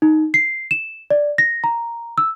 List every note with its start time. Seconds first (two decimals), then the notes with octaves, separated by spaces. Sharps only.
0.02 D#4
0.34 C7
0.71 E7
1.10 D5
1.38 A#6
1.64 A#5
2.18 E6